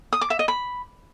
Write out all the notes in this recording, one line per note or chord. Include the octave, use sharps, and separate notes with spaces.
D#6
D6
E5
D#5
B5